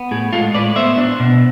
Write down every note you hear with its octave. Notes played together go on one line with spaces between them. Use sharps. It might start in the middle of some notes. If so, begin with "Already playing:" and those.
Already playing: B3
A2 G#4
G#3 F4 A4
A2 B4 D5
B3 C5 E5
D4
B2